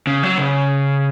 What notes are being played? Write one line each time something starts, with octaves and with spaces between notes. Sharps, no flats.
C#3
F#3
C#3